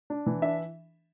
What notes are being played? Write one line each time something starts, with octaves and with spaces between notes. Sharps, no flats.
D4
E3
D4 E5